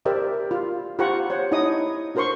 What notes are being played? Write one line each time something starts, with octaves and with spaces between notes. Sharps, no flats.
G4 A#4 C5 D5 E5
F4
F4 G4 C5 F#5 A#5 C#6
C5 C#5 F#5
D#4 E4 C#5 D#5 D#6
D4 F#4 A#4 C5 C6 C#6